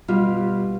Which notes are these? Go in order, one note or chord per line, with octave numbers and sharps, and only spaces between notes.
B2 G3 F4